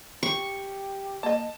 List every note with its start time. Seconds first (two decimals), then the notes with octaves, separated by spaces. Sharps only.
0.23 G4 C#6
1.23 A#3 D#5 A5